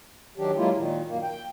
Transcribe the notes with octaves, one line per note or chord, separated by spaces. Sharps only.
D#3 F#3 D4 G4
F#3 G#3 A#3 E4 F4
A#2 D#3
F#2 A#3
G5